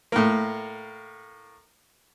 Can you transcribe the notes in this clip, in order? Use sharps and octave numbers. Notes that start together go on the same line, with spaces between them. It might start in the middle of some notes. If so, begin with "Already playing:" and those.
A2 A#3